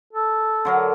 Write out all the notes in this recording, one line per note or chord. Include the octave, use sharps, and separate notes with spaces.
A4
D3 F#3 A#4